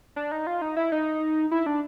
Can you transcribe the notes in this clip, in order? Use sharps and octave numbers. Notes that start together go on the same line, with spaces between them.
D4
D#4
F4
D#4
E4
D#4
E4
D4